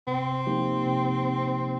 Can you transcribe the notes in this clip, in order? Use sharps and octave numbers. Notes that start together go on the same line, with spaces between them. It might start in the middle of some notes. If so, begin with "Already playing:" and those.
C3 C4
F3 A#3 D#4 G4
C3